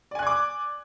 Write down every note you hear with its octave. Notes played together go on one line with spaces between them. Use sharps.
D5 G#5 D6 F#6 G#6